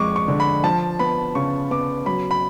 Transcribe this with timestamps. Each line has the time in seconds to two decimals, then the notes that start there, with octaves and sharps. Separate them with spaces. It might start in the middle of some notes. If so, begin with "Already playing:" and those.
Already playing: F2 G#3 C#6 D6
0.16 C#6
0.28 D3
0.40 B5
0.64 F3 A5
0.99 B3 B5
1.35 C#3 C#6
1.70 B3 D6
2.06 F#3 B5
2.31 B5